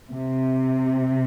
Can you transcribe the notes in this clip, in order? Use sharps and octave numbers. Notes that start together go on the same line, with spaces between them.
C3